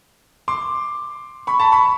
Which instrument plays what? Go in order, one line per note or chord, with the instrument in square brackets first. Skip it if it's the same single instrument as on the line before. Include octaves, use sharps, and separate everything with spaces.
[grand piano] C6 D6
B5 C#6
A5 B5
B5 C#6